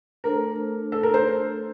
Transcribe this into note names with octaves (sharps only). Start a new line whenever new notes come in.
A3 D4 A4 A#4 C5
A4
A#4
C5